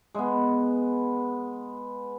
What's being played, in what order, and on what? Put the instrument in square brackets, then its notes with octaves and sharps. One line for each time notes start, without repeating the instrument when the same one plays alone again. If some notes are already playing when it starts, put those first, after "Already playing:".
[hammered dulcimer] G#3 B3